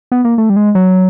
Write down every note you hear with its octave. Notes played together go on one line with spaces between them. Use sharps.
B3
A#3
A3
G3
G#3
F#3